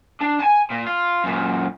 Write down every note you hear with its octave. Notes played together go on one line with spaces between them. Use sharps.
D4
G#5 A5
A#2
F4
F#2 A#2